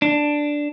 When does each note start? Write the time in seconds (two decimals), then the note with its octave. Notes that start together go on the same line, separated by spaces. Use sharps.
0.02 D4